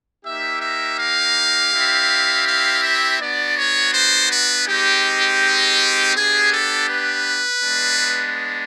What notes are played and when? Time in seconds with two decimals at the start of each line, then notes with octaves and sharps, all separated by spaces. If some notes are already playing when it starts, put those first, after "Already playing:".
0.24 A#3 D#4 G4 E5
0.61 E5
0.98 F5
1.72 C4 E4 G4
2.46 F5
2.83 E5
3.19 B3 D4 F#4 D5
3.56 C#5
3.93 C5
4.30 B4
4.67 G#3 C4 D#4 G4
6.14 B3 D4 G4 G#4
6.52 A4
6.89 B4
7.62 G#3 B3 D4